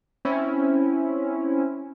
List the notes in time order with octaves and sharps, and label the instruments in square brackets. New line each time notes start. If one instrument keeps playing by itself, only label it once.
[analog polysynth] C4 C#4 E4